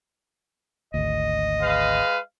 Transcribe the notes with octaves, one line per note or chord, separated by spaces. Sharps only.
G#1 D2 D#5
G#3 B4 F5